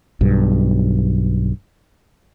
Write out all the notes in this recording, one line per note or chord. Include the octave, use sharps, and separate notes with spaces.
B1 G2